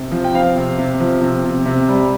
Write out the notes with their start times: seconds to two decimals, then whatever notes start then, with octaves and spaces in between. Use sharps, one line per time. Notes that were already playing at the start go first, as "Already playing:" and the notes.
Already playing: C3
0.11 F3
0.24 G5
0.34 C4 F5
0.56 C3
0.78 C3
1.00 F3
1.21 C3
1.44 C3
1.65 C3
1.88 G3